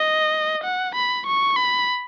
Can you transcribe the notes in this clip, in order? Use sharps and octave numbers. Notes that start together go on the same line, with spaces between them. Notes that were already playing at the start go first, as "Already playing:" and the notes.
Already playing: D#5
F#5
B5
C#6
B5